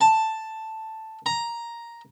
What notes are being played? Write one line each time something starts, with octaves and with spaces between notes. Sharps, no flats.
A5
A#5